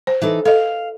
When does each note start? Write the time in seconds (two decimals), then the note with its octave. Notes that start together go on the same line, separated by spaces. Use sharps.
0.07 C5
0.22 E3 D#4 A4
0.45 A4 D#5 F5